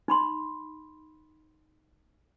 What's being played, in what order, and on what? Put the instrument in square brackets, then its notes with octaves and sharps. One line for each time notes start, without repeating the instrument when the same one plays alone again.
[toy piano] D#4 B5 C6